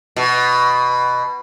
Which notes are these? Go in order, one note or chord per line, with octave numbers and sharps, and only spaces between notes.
B2